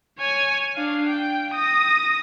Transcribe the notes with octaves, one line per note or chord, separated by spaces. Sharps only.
C#5 G#5
D4 F5
G5
D#6 A#6